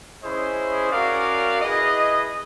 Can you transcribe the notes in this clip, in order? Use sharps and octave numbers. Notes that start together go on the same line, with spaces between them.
C#4 E4 G#4 C5 D#5
C#4 F#4 A#4 D5 F5
E4 G#4 B4 D#5